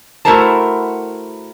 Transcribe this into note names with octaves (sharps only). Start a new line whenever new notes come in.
A3 E4 F#4 A#4 C5 A5